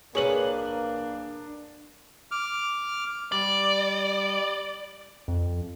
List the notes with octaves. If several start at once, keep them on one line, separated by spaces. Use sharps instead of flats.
A#3 D4 G#4 B4 C#5 F#7
D6 F6
G3 D5
F2